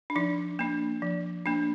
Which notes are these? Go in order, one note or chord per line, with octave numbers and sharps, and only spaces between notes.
D4
F3 D#4
A#3 D4
F3
A#3 D4